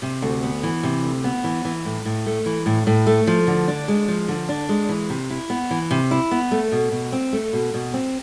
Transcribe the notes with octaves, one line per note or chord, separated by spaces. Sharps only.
C3
D2
B3
E3
C3
D2
B3
E3
E3
A2
A2
A3
E3
A2
A2
A3
F3
D3
D4
G#3
F3
D3
D4
G#3
E3
C3
E4
B3
E3
C3
E4
B3
A3
B2
B2
C4
A3
B2
B2
C4